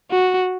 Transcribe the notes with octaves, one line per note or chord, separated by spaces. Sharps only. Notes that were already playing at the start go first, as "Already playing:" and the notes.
F#4